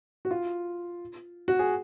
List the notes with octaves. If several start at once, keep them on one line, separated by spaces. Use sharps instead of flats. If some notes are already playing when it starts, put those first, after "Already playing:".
F#4
F4
F#4
G#4